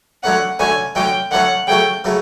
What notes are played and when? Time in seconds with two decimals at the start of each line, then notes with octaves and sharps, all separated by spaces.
0.23 D3 F#3 A3 C#4 F#5
0.59 D3 F#3 A3 C#4 G#5
0.95 D3 F#3 A3 C#4 G5
1.31 D3 F#3 A3 C#4 F#5
1.67 C#3 F#3 A3 C#4 G5
2.04 C#3 F#3 A3